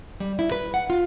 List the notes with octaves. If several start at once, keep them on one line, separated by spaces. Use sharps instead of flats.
G3
E4
B4
F#5
F4